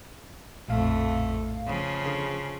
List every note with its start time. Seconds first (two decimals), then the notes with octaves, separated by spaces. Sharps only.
0.69 A#1 F2 A2 A3 F5
1.67 C#3 F3
2.06 D3 G#4